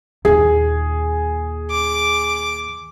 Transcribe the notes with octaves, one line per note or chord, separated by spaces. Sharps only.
D#2 A#2 G#4
D6